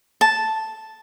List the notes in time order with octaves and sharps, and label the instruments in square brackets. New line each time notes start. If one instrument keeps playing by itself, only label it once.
[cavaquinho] A5